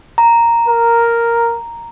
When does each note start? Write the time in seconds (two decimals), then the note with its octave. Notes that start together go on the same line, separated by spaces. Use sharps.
0.18 A#5
0.68 A#4